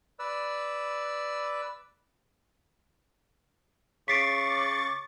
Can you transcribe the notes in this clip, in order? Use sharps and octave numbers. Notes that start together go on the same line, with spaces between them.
B4 D5 E6
C#3 C#6 D6 A6 B6 C7 D7